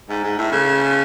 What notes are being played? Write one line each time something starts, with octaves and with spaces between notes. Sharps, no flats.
G#2
G#2
A2
C#3